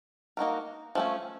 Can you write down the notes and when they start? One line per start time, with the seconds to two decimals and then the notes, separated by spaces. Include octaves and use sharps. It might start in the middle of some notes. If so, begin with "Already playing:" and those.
0.37 A#3 D#4 F#4 A#4
0.95 F3 A3 C#4